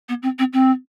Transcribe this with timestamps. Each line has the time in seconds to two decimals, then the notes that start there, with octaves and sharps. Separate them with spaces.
0.09 B3
0.23 C4
0.39 C4
0.53 C4